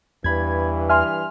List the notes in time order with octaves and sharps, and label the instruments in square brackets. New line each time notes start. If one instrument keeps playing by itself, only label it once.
[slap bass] E2 [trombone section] G2 E3 [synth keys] B5 G#6
[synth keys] E5 G#5 C6 [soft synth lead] F6